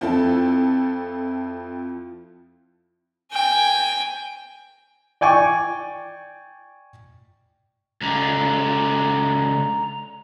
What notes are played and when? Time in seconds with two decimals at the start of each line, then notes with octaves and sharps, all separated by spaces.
0.01 F2 F3 C4 E4 A4
3.32 G5 G#5
5.21 D5 G5 G#5 C#6 D6
8.01 C#2 D3 A#5